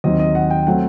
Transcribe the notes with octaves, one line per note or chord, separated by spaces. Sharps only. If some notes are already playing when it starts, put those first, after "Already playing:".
D#2 D#3 F#3 C4 D#5
D#5
F#5
G5
F#3 A3 C4 F#5